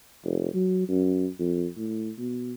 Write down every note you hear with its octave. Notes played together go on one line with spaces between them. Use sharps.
F1
F#3
F#2
F2
A2
B2